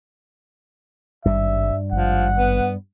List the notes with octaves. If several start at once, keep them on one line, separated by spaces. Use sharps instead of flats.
G#1 G2 G3 E5
G#1 F3 F#5
B3